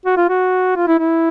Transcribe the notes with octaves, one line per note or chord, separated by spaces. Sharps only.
F#4
F4
F#4
F4
E4
E4